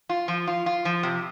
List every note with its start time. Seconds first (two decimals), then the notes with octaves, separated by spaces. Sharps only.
0.09 F4
0.28 F3
0.47 F4
0.66 F4
0.85 F3
1.03 C3